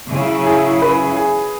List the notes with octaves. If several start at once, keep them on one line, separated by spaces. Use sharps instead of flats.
C#3 F#3 E4
G#4
B4
G#4